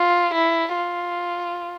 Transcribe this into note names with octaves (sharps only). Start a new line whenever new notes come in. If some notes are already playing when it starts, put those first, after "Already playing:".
Already playing: F4
E4
F4